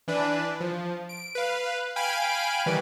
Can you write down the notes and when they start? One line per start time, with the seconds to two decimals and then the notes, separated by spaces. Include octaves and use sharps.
0.08 E3 D4 B4
0.60 F3
1.09 D7
1.35 B4 F5
1.96 F5 G5 G#5 B5 D7
2.66 D#3 E3 G3 B4